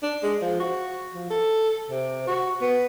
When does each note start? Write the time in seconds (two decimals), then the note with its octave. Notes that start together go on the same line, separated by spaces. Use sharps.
0.03 D4
0.23 G#3
0.42 F3
0.60 F#4
1.15 F3
1.31 A4
1.91 C3
2.27 F#4
2.62 B3